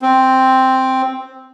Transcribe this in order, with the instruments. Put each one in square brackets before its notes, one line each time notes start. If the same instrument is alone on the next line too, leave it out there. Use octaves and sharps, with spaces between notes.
[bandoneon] C4